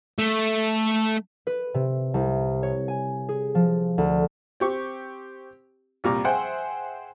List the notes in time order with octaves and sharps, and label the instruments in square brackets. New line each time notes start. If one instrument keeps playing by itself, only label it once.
[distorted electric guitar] A3
[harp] B4
C3
C2
C#5
G#5
G#4
F3
D2
[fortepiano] C4 G4 C#6
C2 A#2 G3 A#5 D6
G#4 C5 E5 F#5 G5